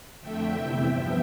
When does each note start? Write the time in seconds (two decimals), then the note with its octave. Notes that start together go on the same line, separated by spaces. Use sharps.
0.21 F2 D3 A3 E5 G5
0.52 E2 C3 E3
0.82 G2 F3 B3 E5 G5